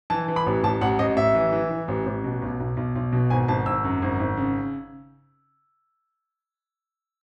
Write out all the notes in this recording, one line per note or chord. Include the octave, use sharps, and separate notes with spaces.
E3 A5
E3
B5
A1
A1 A5
A1 F#5
A1 D#5
A1 E5
E3
E3
E3
A1
A1
B2
B1
B1
B1
B1
B2
G#1 G#5
G#1 A5
G#1 E6
F#2
G#1
G#1
C#3